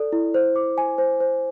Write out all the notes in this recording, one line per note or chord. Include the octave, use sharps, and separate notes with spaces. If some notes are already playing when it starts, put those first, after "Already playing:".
Already playing: A4 D5
E4
C5
D6
G#5
C5
C5